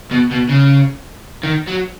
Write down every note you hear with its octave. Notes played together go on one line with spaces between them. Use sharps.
B2
B2
C#3
D#3
F#3